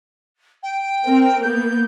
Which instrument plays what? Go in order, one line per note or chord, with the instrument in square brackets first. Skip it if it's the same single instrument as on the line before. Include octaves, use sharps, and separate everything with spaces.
[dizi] G5
[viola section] C4 A#4
[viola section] A#3 B3 [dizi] G6